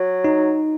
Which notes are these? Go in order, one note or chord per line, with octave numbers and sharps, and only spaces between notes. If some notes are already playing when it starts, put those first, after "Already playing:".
Already playing: F#3
D#4